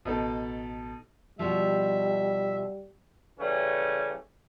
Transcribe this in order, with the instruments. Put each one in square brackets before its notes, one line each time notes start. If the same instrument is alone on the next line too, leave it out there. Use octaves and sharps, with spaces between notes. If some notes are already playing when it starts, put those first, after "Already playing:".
[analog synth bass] A1 [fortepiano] B2 D#4 A4
[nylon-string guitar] B2 F3 [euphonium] G3 [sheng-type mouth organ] E5
[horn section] C#3 E3 G3 A3 C#4